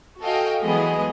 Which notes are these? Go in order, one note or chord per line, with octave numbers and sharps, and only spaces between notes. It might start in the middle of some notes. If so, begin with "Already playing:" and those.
F#4 A4 D#5 F5 G5 G#5
E3 F#3 G#3 B3 G#4 D#5